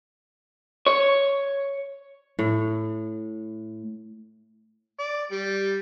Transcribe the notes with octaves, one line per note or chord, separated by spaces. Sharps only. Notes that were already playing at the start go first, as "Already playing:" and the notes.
C#5
A2
D5
G3